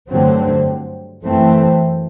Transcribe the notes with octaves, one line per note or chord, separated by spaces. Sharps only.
G2 D3 F#3 A3 C4
F#2 E3 A3 C4